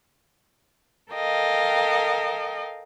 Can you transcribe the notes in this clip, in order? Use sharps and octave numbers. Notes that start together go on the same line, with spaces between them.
A4 A#4 D#5 F5 G5